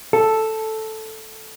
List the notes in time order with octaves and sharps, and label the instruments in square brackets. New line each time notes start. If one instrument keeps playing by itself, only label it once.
[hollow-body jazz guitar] A4